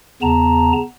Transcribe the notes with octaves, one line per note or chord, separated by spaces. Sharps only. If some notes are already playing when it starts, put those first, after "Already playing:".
E2 C#3 B3 A5 A#5